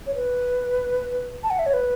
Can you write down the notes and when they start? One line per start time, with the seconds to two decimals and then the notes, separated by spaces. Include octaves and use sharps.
0.07 C#5
0.15 B4
1.43 A5
1.50 F#5
1.59 E5
1.66 C#5
1.73 B4